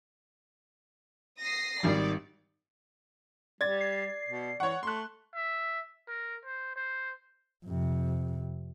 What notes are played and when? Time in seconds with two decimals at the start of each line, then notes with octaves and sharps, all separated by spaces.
1.39 D#6 A#6 C7
1.83 G#1 D#3 G3 D5
3.61 G3 D5 G#6 A6
3.80 C7
4.27 B2
4.60 E3 C#5 F#5 C#6
4.83 A3 C6 F#6
5.34 E5
6.08 A#4
6.45 C5
6.76 C5
7.66 F2 C3